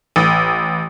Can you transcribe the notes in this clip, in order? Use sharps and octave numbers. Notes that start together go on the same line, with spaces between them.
A1